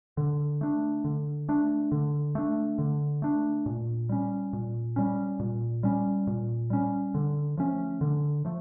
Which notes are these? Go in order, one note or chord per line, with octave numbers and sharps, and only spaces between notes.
D3
A3 D4
D3
A3 D4
D3
A3 D4
D3
A3 D4
A#2
G3 C#4
A#2
G3 C#4
A#2
G3 C#4
A#2
G3 C#4
D3
F3 A3 C#4
D3
F3 A3